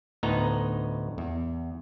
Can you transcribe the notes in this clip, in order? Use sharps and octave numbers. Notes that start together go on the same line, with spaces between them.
D2 A2 B3 D#4 A#5
E2